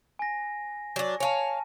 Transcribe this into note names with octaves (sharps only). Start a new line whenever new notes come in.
G#5 A#6
F#3 D4
C#5 F5 G#5 A5